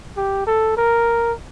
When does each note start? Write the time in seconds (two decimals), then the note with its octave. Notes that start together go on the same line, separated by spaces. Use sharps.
0.17 G4
0.46 A4
0.77 A#4